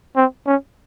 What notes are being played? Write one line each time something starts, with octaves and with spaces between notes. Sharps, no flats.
C4
C#4